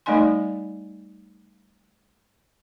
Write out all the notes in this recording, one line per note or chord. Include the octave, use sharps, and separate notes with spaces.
G3 A3 D#4 D#5 G#5 C6